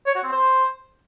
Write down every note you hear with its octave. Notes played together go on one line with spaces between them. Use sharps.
C#5
F#4
C4
C5